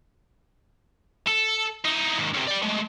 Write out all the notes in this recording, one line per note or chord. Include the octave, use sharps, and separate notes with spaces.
A4
D#4 E4
D#2 G#2
F#2 C3
D5 G5
G#3 A3